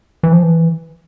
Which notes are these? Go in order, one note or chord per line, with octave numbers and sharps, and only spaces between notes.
E3
F3
E3